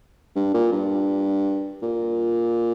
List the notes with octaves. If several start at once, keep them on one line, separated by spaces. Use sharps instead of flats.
G2
A#2
G2
A#2